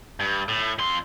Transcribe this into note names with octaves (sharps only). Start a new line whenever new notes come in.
G2
A2
F2 C6